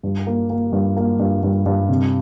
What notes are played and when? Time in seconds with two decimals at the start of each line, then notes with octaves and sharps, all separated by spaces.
0.03 G2
0.27 A#3
0.50 A#3
0.72 G2
0.96 A#3
1.19 G2
1.43 G2
1.66 G2
1.89 C3